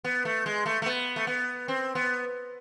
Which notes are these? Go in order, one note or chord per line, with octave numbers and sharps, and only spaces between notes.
B3
A3
G#3
A3
A3
B3
A3
B3
C4
B3